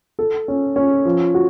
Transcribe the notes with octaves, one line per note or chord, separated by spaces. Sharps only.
A4
C#4
C#4
F3
F#4